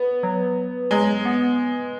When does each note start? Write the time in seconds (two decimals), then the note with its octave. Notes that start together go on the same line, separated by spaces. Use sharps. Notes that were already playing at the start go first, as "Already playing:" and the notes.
Already playing: B3
0.23 F#3
0.91 F#3 G#3
1.25 B3